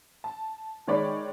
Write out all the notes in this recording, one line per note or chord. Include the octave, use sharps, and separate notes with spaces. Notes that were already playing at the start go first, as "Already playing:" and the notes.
A5
D#3 G#3 C#5 D5 B5